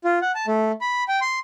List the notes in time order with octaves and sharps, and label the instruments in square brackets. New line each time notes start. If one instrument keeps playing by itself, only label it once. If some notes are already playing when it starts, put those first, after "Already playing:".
[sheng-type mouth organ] F4
F#5
A5
A3
B5
G5
C6